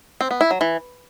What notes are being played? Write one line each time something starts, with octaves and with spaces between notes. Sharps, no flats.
C4
B3
E4
F#3
E3